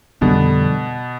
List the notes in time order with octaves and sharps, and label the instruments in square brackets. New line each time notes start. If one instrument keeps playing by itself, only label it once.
[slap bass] F2 D3 G3 [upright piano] B2 B3